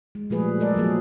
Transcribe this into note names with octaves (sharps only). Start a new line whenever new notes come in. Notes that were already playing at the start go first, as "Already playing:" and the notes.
G#3
A#2 F3 G3 A3 G#4 B4
G#3 A3 A4 A#4 D5 D#5
F3 F#3 A#3 G#4